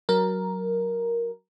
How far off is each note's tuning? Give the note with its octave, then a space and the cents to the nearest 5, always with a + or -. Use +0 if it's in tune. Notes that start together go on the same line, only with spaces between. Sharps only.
F#3 +10 A#4 +5